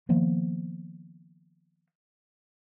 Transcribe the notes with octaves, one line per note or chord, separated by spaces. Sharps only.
D#3 F3 A#3 B3